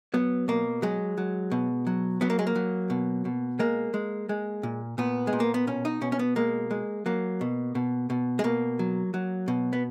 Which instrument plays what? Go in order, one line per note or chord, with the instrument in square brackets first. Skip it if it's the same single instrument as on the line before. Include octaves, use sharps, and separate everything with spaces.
[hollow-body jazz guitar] F#3 B3
B2 A#3
F#3 G#3
F#3
B2
F#3
F#3 B3
A#3
G#3
A#3
F#3
B2
B2
G#3 A#3
G#3
G#3
A#2
A#2 B3
G#3
A#2
A#3
B3
B2 C#4
D#4
B2 C#4
C#4
B3
G#3 A#3
G#3
F#3 A#3
B2
B2
B2
G#3
B2 A#3
F#3
F#3
B2
B3